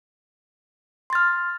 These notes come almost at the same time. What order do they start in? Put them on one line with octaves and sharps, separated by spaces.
C6 A6 F6